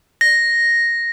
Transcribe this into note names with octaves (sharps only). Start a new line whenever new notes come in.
A#6